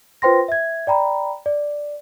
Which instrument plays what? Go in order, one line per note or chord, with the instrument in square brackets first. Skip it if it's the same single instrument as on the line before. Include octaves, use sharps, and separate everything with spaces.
[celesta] F4 B4 C5 G5 C6 A#6
E5 G#6
D5 G5 A#5 B5
D5